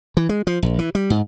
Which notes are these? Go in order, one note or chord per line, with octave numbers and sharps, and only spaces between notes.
E3
G#3
F3
A#1
E3
G3
G#2